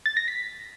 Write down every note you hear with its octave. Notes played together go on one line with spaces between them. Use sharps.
A6
A#6
B6